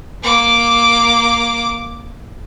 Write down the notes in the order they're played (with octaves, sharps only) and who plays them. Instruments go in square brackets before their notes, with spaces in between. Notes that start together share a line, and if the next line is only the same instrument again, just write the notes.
[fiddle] A#3 D6